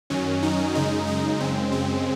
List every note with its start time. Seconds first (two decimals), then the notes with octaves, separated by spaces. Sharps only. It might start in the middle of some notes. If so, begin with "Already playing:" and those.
0.10 F#2 D#3 F#3 C#4
0.43 D#4
0.75 F#2 C#3 G#3 D#4
1.07 D#4
1.40 F#2 C#3 G#3 C4
1.72 C4